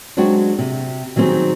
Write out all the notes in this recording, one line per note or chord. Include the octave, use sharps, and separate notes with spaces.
F#3 G#3 C4 D4 F#4
C3
D#3 F#3 G3 C4 D#4 G#4